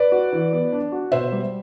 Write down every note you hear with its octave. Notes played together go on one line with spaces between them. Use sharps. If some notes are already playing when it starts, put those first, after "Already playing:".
Already playing: B4 D5
F#4
E3
B3
D4
F#4
B2 C5 E5
G3